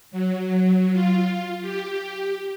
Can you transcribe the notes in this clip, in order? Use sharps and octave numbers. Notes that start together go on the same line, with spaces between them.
F#3
F4
G4